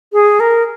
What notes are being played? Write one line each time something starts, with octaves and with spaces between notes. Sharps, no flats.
G#4
A#4